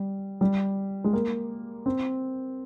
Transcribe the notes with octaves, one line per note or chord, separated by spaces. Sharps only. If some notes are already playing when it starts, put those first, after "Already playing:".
Already playing: G3
G3
G#3
A#3
C4